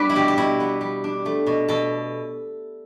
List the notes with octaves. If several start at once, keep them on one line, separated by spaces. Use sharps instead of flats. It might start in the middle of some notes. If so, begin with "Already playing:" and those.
Already playing: G3 B3 D4 B4 D5
E4
B2 G4
G4
B2 E4
B3
G3
D4
A3
B2
B2 A4